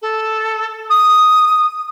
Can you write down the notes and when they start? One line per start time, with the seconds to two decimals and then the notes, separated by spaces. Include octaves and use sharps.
0.02 A4
0.90 D#6